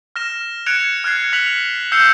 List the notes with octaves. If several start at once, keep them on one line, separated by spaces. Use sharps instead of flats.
F6 A#6 E7
F#6 G#6 C#7 D7 E7 F7
F6 F#6 G#6 C7
F6 F#6 B6 F7 F#7
E6 G6 C7 C#7 E7 G7